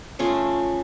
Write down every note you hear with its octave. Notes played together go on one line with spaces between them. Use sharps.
C#3 A3 C#4 F4